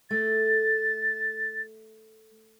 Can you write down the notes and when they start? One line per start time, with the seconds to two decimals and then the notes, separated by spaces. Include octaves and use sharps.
0.11 A3 A6